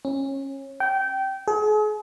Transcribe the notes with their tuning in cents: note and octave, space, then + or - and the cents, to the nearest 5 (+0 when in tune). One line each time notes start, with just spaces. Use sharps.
C#4 -25
G5 -20
G#4 +40